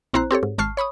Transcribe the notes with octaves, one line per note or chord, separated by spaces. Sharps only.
A#1 C4 E4 C5 A#5 F#6
C4 G4 A4 C#5
G#2
G#1 A5 C#6 F6 C7
C#5 B5 C#6 D#6